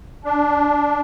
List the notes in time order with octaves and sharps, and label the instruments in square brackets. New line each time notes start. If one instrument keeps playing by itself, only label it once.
[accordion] D4